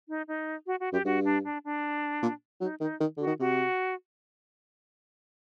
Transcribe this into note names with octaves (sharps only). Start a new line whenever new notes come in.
D#4
D#4
F#4
F#4
F#2 G4
G2 F#4
D4
D4
D4
A#2
F#3 D#4
D#3 D#4
D#3
D3 F#4
D#3
C3 F#4